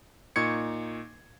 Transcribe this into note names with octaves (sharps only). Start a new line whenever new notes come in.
A#2 D#4 C#6 G#6 C#7